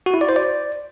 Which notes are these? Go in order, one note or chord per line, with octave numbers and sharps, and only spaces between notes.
F#4
E4
D5
C5
D5